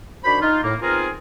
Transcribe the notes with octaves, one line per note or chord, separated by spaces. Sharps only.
D#3 D4 F#4 C5 B5
D#4 F4
A2 A#3
B3 C4 D#4 F4 G#4 A#4